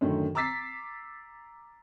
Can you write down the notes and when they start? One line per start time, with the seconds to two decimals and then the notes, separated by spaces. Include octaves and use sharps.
0.01 F#2 A2 D3 D#3
0.35 A#5 D6 E6 A6 B6 C7